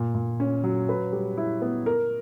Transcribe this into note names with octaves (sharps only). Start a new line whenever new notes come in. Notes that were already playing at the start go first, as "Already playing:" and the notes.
Already playing: A#2
A#2
C#4
F#3
B4
G3
E4
B3
A#4